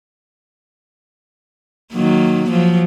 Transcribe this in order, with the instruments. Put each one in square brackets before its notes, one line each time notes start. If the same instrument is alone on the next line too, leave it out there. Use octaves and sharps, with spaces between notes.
[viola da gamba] D#3 F#3 A#3
F3 F#3